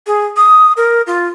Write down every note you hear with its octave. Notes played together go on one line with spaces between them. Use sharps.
G#4
D#6
A#4
F4